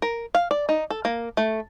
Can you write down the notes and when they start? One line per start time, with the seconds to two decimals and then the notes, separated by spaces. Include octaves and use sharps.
0.02 A#4
0.35 F5
0.51 D5
0.69 D#4
0.90 A4
1.05 A#3
1.37 A3